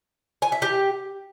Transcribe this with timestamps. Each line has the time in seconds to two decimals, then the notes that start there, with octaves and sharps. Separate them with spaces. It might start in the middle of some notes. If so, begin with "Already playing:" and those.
0.42 G#5
0.52 E5
0.62 G4